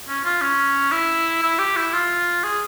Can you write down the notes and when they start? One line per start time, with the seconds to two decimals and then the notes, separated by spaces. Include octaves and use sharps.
0.09 C#4
0.24 F4
0.42 C#4
0.92 E4
1.43 E4
1.59 G4
1.76 E4
1.93 F4
2.44 G#4